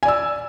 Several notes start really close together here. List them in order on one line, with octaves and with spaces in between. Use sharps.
G#5 D5 E6